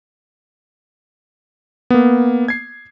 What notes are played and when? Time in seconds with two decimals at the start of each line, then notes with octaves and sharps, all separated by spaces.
1.90 A#3 B3
2.48 G#6 C7